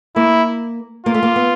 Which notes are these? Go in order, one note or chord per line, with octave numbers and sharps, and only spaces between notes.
A#3 E4
A#3 F4
A3
A#3
B3